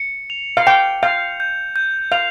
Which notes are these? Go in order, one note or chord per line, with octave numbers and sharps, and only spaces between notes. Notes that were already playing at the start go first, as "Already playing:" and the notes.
Already playing: C#7
F7
F5
G5 F7
F5 G6
G6
G6
F5 F7